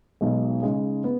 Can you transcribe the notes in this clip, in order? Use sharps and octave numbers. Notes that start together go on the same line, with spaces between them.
B1 B2 G#3 D#4
C#3 G#3 D#4
B3